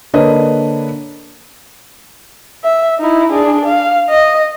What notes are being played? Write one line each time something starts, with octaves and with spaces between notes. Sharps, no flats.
D3 A#3 D4 B4 C#5 D#5
E5
D#4 E4
D4 G#4
F5
D#5